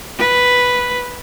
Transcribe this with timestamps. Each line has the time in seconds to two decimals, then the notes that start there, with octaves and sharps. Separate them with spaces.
0.19 B4